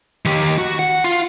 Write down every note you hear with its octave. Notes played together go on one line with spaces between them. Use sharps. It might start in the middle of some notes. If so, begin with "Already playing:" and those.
D#3 G4
F#4
F#5
F4